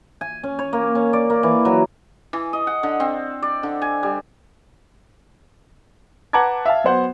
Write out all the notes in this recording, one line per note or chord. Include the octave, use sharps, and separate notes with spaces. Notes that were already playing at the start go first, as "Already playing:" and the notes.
G#5
C#4
C#5
A#3
C#4
D5
A#3
E3
F#3
E3
D#5
F#5
D3
C4
D5
D3
G#5
G3
B4 F#5 A5 A#5 D6 G#6
E5 F5 A5
F#3 B3 C5 F#5